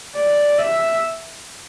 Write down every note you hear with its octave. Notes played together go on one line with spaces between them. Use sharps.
D5
E5